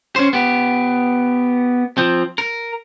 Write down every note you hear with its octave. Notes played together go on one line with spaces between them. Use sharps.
C#4 C5
B3 G4
F3 C4
A#4